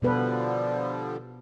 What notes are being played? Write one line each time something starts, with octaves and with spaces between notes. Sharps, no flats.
B2 D3 F3 G3 B3 B4